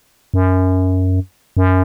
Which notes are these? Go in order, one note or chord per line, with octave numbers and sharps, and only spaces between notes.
F#2
F#2